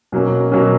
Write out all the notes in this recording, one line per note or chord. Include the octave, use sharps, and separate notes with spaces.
B2 F#3 A#3 C#4
B2 F#3 A#3 C#4